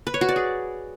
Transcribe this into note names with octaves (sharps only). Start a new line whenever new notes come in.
B4
C#5
F#4
D5
G#4